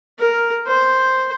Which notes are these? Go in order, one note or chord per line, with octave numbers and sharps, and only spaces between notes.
A#4
C5